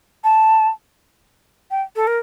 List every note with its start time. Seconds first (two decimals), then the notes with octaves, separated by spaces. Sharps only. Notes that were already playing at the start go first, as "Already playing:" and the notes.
0.24 A5
1.71 G5
1.96 A4
2.07 A#4